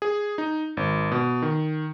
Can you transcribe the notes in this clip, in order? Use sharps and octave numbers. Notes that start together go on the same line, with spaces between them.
G#4
D#4
G#1
B2
D#3